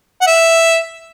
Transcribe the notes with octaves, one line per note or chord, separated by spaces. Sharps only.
F#5
E5